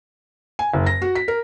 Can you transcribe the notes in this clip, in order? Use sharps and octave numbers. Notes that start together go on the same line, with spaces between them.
G#5
F#1
A#6
F#4
B6
A#4